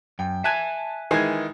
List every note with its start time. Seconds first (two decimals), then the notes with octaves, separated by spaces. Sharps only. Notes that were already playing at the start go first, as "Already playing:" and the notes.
0.19 F#2 G5
0.44 E5 G#5 A5 F#6 G#6
1.11 D#3 E3 G#3 G#6 C7